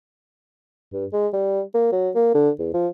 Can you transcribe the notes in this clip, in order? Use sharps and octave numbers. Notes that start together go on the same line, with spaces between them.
G2
G#3
G3
A#3
F#3
A#3
D3
E2
F3